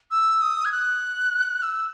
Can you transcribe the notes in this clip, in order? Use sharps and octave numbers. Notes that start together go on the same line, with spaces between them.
E6
D#6
G#6
F#6
E6